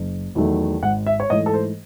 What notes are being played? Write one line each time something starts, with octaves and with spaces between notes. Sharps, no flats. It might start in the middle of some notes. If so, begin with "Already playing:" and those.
Already playing: F#1
E2 D#3 F#3 A3
G#1 F#5
E5
C#5
G#2 E3 A3 D#5
A4
C5